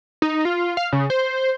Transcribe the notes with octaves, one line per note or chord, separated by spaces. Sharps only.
D#4
F4
F5
C#3
C5